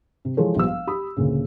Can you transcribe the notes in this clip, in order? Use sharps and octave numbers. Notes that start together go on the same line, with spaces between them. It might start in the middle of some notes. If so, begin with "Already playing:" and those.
C3
E3 F3 G#3 A4 C#5
A#1 F3 G3 B3 E6
F5
G4 B5 D#6
D2 A#2 C#3